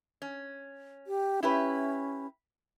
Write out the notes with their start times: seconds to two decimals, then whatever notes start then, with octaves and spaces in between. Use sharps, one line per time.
0.22 C#4
1.07 G4
1.43 C#4 E4 G4 B4